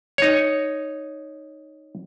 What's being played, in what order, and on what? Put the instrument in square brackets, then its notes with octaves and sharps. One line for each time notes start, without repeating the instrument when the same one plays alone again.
[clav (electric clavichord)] D#4 C#5